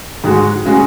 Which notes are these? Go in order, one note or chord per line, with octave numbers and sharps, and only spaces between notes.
G#2 G#3 F#4
C#3 G#3 F#4